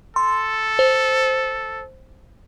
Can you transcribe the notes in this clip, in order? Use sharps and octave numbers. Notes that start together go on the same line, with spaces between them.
A4 C6
C5